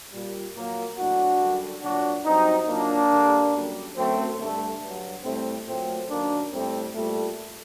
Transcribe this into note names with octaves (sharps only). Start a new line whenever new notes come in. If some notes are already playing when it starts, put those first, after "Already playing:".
A#2 G3
A#2 F#3 A#3
A2 F#3 D4 F#4
F#2 D3 G3
A#2 F#3 D4 F#4
G2 F#3 C4 D#4
A#2 F#3 A#3 D4
G2 D3 G3
F#2 D3 G3
F#2 F#3 A3 C4
G2 D3 G3 A3
G2 F#3
A2 G3 A3 C4
A#2 F#3 A3 C4
F#2 D#3 F#3 A#3 D4
A2 G3 A3 C4
A#2 G3 A3